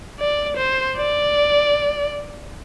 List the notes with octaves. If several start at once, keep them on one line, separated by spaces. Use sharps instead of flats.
D5
C5
D5